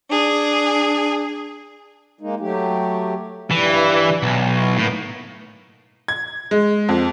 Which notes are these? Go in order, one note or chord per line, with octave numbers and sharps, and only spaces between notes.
D4 G#4
G#3 A#3 D#4
F#3 A3 G4
G2 E3 G3 E4
B1
E4 C#5 F5
A2 A#3 B3 D#4
G#6
G#3
F2